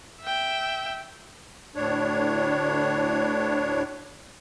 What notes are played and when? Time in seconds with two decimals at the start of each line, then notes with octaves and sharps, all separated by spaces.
0.21 E5 G5
1.76 D2 A2 D4 C#5